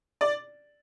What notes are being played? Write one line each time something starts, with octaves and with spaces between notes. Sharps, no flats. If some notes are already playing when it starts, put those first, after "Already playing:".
D5